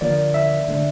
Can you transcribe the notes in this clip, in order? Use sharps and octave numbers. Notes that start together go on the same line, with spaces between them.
D3 F3 A#3 D5
E5
D3 A3 D4